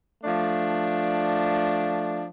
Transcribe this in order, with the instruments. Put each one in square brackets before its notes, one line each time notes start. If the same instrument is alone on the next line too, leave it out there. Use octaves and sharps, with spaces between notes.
[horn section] F3 A3 D4